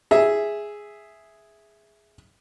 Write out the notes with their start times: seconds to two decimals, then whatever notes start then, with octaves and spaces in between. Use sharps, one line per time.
0.11 G#4 E5